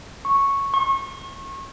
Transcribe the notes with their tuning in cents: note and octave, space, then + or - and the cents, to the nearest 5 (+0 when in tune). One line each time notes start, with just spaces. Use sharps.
C#6 -5
C#6 -30